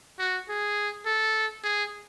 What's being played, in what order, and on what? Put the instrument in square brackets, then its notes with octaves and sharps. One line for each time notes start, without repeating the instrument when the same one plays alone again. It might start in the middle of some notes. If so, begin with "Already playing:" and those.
[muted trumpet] F#4
G#4
A4
G#4